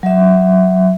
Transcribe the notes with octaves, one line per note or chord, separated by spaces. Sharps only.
F#3 E5